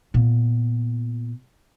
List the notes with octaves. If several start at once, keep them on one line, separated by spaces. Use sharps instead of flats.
A#2 B3